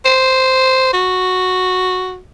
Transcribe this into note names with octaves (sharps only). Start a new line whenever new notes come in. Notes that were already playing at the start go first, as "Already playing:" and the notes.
C5
F#4